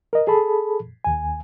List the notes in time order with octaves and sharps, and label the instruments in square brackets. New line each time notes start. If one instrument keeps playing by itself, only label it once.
[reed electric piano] A#4 D#5
G#4 A4 A5 B5
D#2 G#5